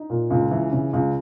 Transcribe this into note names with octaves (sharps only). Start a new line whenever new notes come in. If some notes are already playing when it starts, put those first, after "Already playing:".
Already playing: D#4
A#2
C#2
E3
C#3
C#2